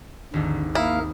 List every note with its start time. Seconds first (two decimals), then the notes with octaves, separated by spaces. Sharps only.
0.34 G#1 D#2 D3
0.75 A#3 E4 A#4 F5 D#6